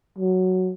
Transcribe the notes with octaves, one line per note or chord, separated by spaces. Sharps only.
F#3